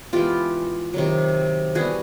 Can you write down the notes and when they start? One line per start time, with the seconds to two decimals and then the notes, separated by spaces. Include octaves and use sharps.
0.13 E3 G#3 B3 F4 G4
0.94 C3 D#3 F#3
1.75 E3 G3 B3 F#4 G#4